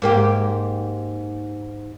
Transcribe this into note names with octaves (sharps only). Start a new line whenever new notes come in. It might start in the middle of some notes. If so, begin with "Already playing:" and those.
G#2 A#3 G4